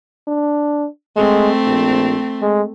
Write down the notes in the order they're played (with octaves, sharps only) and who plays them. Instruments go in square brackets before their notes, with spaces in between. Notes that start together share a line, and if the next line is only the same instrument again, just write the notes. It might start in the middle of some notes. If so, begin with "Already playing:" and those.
[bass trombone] D4
[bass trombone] G#3 [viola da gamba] A3 C4
[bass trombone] A#1
G#3